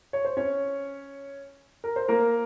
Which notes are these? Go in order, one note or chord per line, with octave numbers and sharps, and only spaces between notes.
C#5
C5
C#4 C#5
A#4
C5
A#3 A#4